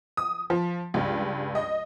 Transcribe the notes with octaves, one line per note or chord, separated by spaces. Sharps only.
D#6
F3
C#2 G2
D#5